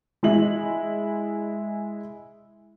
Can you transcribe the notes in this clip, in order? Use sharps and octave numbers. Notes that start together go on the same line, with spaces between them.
G#3 E4 F#7